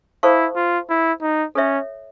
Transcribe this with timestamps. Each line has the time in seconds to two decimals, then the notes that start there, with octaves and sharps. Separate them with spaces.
0.23 E4 A4 C5 F5 A5 C#6
0.56 F4
0.90 E4
1.21 D#4
1.55 C#4 A4 C#5 E5